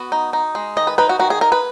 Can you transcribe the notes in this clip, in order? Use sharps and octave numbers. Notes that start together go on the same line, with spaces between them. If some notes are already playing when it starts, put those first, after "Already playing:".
Already playing: B3 F#4
D#4
D#4
G#3
D#3 D#5
B4
D#4 B4
F#4
D#3 F#4
G#4
D#4 A#4
B4